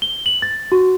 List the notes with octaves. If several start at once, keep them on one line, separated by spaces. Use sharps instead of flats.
G7
F#7
A6
F#4